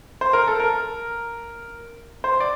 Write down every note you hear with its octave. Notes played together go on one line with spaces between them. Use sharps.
C5
A#4
A4
A#4
C5
D5